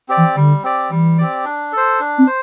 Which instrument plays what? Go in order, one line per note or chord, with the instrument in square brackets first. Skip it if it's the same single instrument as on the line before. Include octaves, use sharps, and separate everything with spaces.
[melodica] C4 G4 D5
[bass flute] E3
[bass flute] D3 [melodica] G3
[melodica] C4 G4 D5
[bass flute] E3 [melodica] G3
[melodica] C4 G4 D5
D4
A4 C5
D4
[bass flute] C4
[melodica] C5